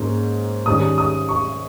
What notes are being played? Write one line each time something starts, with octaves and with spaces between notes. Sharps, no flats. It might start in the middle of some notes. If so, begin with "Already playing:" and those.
Already playing: G#2 A#3 C#4
G#2 D#3 G3 C#4 D#6
D#6
C#6